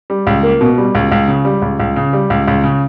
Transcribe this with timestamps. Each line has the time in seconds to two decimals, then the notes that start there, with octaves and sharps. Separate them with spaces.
0.10 G3
0.27 C#2
0.43 A#3
0.61 B2
0.78 G3
0.95 C#2
1.12 C#2
1.28 C#3
1.45 G3
1.62 C#2
1.80 C#2
1.96 C#3
2.13 G3
2.30 C#2
2.48 C#2
2.64 C#3